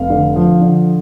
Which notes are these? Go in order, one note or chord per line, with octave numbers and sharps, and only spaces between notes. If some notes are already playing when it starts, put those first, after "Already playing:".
Already playing: F1 F5
D3
F3
D3